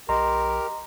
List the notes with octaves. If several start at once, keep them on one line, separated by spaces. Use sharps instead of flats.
B1 G4 A#4 D#5 A#5 C6